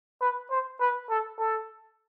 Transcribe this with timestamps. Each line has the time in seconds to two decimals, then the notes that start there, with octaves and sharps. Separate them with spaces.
0.21 B4
0.50 C5
0.80 B4
1.10 A4
1.38 A4